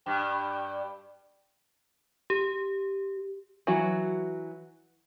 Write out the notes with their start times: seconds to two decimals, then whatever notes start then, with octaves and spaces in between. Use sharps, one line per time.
0.06 G2 G4
2.30 G4
3.67 E3 F#3 F#4